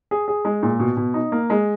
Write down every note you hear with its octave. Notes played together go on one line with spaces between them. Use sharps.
G#4
G#4
G#3
A#2
B2
B2
D#4
A#3
G#3